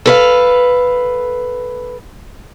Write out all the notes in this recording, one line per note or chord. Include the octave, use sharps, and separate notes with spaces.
A4 B4 F5